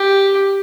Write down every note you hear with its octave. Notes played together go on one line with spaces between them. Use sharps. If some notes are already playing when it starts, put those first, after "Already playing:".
Already playing: G4